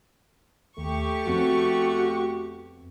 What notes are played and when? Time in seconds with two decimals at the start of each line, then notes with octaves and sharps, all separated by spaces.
0.78 D#2 A3 G4 C#6
1.26 F2 B3 C4 F#4